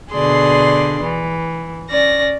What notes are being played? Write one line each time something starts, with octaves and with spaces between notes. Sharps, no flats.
B2 D3 G#4 D5 C6
E3
C#4 D5 A#6